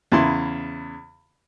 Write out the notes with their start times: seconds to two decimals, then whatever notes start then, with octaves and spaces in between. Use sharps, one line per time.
0.12 E2 C#3 E4 C6